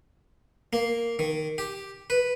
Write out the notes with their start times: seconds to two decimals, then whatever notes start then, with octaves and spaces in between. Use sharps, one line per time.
0.73 A#3
1.19 D#3
1.58 G4
2.10 B4